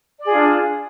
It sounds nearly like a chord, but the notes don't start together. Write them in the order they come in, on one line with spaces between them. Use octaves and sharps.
D5 G#4 F4 D4